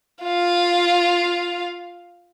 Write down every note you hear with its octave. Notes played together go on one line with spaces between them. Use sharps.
F4 F5